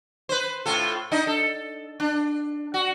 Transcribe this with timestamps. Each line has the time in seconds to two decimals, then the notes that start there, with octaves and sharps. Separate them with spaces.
0.29 B4 C5
0.66 A2 F4 A4
1.11 D4 D#4 D#5
1.27 A4
2.00 D4
2.74 F#4